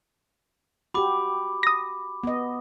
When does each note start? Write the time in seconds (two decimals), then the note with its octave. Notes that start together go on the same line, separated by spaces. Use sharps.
0.94 F#4 G4 B5 D6
1.63 D#6 A#6
2.23 B3 D#5